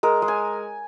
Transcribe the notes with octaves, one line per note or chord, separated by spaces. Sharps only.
G#3 A#4
G#3
G#5